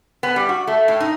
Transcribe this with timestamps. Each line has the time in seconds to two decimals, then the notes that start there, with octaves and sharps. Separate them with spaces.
0.23 B3
0.36 G3
0.49 F#4
0.67 A3
0.88 A2
1.00 D#4